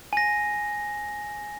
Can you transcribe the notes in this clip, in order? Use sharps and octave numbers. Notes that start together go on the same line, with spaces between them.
G#5 A#6